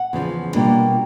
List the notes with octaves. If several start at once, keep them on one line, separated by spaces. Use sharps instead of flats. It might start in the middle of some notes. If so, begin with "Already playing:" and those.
Already playing: F#5
E2 C#3 F3
B2 G3 A#3 D4 F4